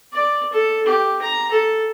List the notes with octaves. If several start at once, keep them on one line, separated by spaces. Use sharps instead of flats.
D5
A4
G4
A#5
A4